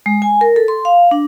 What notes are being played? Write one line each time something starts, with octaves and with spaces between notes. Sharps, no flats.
G#3
G#5
A#4
A4
C6
F5
D4